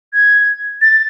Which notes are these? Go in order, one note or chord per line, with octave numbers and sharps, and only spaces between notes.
G#6
A6